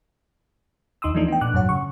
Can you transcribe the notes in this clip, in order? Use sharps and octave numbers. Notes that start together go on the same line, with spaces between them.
D#2 D#4 C6 D#6 E6
E3 F3 A3 D4 D#4
B3 G5
A#2 D4 D6 F#6
F#2 A2 F#3 C#5 F#5
C#3 C#6